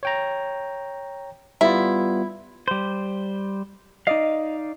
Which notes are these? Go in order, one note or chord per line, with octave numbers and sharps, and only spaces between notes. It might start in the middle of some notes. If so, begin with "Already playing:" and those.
C#5 G5 A#5
G3 B3 E4 F4
G3 C5
D#4 D5 D#5 F5